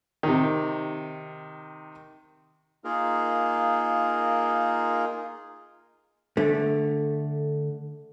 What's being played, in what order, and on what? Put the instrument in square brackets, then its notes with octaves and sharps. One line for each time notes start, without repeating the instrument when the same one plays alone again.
[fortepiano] C3 D#3
[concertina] A#3 D#4 F4 G#4 A#4
[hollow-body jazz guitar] D3 A3